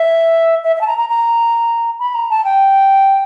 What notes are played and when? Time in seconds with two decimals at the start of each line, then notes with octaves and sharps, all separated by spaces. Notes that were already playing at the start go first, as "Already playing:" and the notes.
Already playing: E5
0.64 E5
0.76 E5
0.81 A5
0.87 A#5
0.98 A#5
1.09 A#5
1.99 B5
2.15 A#5
2.30 A5
2.44 G5